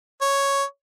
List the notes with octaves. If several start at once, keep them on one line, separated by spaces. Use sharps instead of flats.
C#5